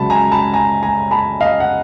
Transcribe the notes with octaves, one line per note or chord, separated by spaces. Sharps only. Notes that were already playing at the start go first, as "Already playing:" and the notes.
Already playing: C#2 C#3 F#3 A5 B5
G#5 A#5
A5 B5
G#5 A#5
G#5 A#5
A5 B5
D#5 F5
F#5